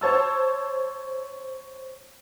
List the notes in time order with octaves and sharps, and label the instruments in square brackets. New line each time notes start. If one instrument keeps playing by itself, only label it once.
[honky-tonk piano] C5 C#5 A5 E6